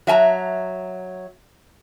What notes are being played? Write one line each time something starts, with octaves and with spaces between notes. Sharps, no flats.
F#3 E5 G#5 A#5